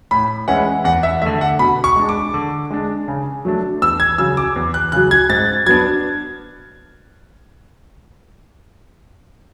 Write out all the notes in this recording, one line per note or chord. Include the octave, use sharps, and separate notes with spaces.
A2 B5
E3 G#3 C#4 E4 F#5
E2 F#5
E5
D3 A3 E5
F#5
B2 B5
C#6
G#3 D4
D6
D3
G#3 D4
C#3
F#3 A3 D4
E2 E6
G#6
C#3 F#3 E6
D6
E2
F#6
C#3 F#3 F#6
G#6
G#2 A6
F#3 B3 D4 G#6